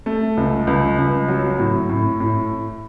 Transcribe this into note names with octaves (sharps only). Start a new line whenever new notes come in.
A3
C#2
C#2
C#2
F#3
A2
A2
A2